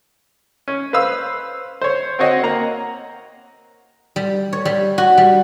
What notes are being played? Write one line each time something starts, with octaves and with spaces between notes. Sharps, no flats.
C#4
B4 C5 F5 E6
C5 C#5
C4 F#4 C#5 D#5 F#5 G5
A#3 F#5 A#5
G3
C#5
G3
F#4
G3